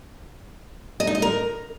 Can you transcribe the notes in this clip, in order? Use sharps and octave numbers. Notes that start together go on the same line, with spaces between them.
D#5
D#4
D#5
A#4